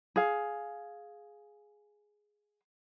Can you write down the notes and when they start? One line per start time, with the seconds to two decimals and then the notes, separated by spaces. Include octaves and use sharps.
0.16 G#4 F5